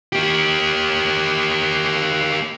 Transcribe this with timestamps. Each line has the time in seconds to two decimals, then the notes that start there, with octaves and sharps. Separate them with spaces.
0.13 A#3 G4